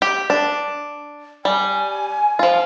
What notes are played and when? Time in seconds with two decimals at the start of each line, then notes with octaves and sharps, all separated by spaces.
0.02 G4
0.30 D4
1.45 G3 G#5
2.39 F3 F4